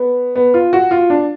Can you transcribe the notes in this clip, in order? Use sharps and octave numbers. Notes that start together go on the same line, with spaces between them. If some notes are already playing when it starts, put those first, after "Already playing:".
Already playing: B3
B3
F4
F#4
F4
D4